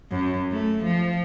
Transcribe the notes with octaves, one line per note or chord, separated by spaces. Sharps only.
F#2
A3
F3